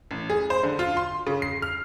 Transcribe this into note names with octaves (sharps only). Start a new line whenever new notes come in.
A1
G#4
C5
D3
F4
C6
C#3
C7
F6